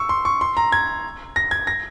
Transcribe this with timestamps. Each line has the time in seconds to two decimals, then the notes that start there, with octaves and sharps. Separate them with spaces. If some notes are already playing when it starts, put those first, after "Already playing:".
Already playing: C#6 E6
0.09 C6
0.25 C#6
0.41 C6
0.57 A#5
0.72 G#6
1.36 A#6
1.51 G#6
1.67 A#6